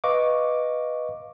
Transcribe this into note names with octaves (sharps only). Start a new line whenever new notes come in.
B4 D#5 F5 C#6 D6